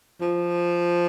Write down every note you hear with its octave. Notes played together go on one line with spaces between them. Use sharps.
F3